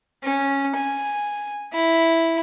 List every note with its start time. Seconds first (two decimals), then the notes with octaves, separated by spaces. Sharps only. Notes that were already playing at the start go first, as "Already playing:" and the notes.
0.23 C#4
0.75 G#5
1.73 E4